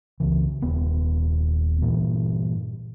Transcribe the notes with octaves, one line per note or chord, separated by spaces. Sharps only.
C#2 C#3 E3
D#1 B3
G2 A#2 E3